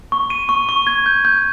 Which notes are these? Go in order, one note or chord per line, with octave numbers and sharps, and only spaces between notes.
C#6
D#7
C#6
C#6
G#6
G6
G6